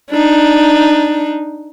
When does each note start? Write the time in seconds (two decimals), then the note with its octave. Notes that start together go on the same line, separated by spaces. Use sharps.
0.10 D4 D#4